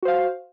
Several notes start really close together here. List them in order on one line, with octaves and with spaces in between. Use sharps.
F#4 C5 F5